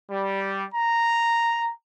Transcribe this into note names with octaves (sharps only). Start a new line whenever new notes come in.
G3
A#5